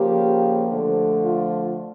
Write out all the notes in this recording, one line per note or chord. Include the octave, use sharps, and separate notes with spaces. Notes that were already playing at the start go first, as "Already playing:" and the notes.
Already playing: C#3 F3 A#3 G4
D3 F3 A3
F4